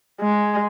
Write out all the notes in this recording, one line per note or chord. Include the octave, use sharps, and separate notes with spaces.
G#3